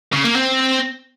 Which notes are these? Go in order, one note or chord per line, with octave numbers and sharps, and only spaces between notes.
C#3
A#3
C4